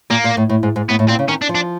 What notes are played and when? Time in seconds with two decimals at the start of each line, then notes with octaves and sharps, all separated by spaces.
0.10 A#2 A#3
0.24 A#2
0.37 A2
0.49 A2
0.63 G#2
0.76 G#2
0.89 A2 B3
0.99 A2
1.09 A#2 C4
1.19 C#3
1.28 D#3 C#4
1.42 D4
1.49 F3
1.55 D4